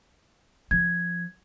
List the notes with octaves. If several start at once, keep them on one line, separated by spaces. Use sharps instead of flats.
F3 G#6